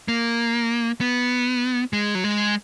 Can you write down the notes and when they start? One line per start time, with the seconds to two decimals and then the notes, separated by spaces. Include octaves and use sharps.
0.08 A#3
1.01 B3
1.93 G#3
2.15 F#3
2.24 G#3